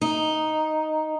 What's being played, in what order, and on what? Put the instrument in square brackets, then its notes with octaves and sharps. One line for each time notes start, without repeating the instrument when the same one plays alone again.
[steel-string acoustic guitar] D#4